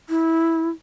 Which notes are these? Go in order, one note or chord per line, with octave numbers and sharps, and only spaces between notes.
E4